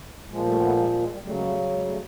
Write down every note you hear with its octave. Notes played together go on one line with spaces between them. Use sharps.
A#2 F3 G#3
G3 A3
C4
A3 B3
G#3 A#3
G3
G#3
G3
C#3 F#3 G3 A3
G#3 A#3
G3 A3
G3
G#3
G3 A3